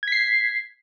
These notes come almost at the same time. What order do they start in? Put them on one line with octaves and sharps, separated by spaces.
G#6 B6 C7